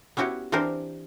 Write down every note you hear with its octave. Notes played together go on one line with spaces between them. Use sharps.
B3 C#4 E4 F#4 G4
E3 C4 D4 G4 A#4 C5